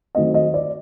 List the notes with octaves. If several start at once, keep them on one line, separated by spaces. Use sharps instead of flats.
D#3 F#3 A3 C4 D#5
D#5
D5